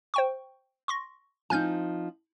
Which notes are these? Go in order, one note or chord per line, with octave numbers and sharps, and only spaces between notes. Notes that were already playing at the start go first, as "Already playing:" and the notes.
C5 G5 C#6
C6 C#6 A#6
F3 C4 D#4 G#5 F6 G6